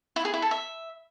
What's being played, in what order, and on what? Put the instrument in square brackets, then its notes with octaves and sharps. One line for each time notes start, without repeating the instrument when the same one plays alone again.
[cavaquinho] E4
G#4
E4
A4
E5